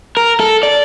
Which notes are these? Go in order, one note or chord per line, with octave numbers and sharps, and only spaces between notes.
A#4
A4
D5